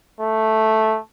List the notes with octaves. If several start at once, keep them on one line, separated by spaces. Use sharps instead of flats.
A3